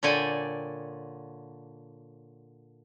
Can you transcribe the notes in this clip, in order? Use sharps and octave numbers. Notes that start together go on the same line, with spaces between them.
A#2 D3 C#5 D5 G5 G#5